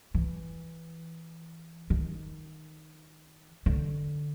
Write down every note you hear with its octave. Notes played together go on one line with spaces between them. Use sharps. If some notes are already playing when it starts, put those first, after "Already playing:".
E3
D#3
D3